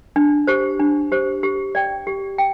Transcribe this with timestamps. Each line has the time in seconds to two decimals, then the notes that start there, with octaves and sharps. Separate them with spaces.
0.16 D4
0.47 G4 C5
0.80 D4
1.12 G4 C5
1.43 G4
1.75 D5 G5
2.07 G4
2.38 G5